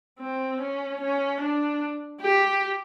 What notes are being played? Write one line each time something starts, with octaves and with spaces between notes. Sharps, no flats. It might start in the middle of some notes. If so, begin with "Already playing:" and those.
C4
C#4
C#4
D4
G4